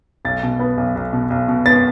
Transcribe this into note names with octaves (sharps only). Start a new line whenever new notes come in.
B1 A6
B2
B3
B1
B1
B2
B1
B2
B3 A6